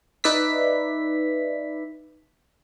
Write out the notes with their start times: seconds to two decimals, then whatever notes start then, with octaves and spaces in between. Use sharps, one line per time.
0.24 D#4 B4 D5 E5 B6